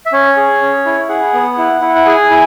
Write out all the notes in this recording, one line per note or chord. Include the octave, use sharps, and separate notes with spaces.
E5
C#4 C#5
G#4
C#4
E4
G#4 F#5
B3
E4
E4
F#5
G#4 G#5
E4